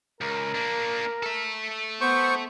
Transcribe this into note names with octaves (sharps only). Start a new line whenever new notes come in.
C#2 A#4
A#3 D4
A4 E5
B3 C5 C#6